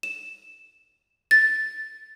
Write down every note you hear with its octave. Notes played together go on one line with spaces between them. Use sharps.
E7
A6